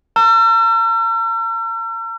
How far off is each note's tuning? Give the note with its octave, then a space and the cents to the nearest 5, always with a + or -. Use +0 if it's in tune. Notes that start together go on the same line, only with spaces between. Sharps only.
A#5 -35 E6 +45